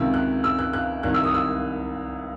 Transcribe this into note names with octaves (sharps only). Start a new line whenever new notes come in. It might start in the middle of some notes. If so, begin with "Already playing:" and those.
Already playing: C#2 C3 D#3 E6
F#6
E6
F#6
F#6
C2 C3 D#3 F#6
E6
D#6
E6